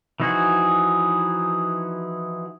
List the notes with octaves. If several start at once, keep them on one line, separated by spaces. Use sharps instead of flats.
E3 F3 D#4 F#4 G#4